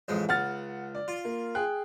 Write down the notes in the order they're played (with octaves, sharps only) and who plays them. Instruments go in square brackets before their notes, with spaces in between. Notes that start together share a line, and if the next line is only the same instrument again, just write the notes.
[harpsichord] A1 F2 G#3
[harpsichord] C#2 [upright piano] F#5 F6 A6
[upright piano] D5
[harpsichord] F4
[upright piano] A#3
G#4 G5 F#6